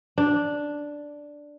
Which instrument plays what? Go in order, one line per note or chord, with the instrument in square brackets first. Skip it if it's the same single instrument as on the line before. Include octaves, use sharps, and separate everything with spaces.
[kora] D4